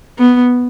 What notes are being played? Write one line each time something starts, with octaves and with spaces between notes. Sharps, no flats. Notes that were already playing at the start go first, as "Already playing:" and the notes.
B3